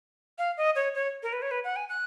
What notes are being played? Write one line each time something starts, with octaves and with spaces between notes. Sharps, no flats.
F5
D#5
C#5
C#5
A#4
B4
C#5
B4
F#5
G#5
F#6